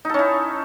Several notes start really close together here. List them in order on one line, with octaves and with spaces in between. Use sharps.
D#4 A4 C#4 E4